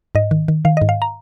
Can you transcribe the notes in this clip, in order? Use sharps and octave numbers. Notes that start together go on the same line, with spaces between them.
G#2 D#5
D#3
D#3
D#3 F5
D#5
G#2
F5
A#5